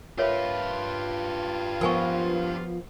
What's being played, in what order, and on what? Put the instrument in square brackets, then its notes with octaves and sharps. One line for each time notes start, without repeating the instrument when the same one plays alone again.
[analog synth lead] F4 [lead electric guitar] G4 B4 [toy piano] A#4 C#5 E5
[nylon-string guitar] F3 B3 [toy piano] A#4 G#5 C#6